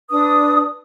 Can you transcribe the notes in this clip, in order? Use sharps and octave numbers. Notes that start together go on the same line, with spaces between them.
D4 B4 D#6